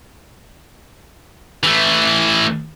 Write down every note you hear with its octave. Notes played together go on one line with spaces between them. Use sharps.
E3 A3